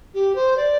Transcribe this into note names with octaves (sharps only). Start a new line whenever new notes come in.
G4
C5
D5